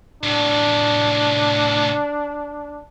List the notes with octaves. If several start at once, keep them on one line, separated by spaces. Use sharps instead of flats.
A2 C3 D4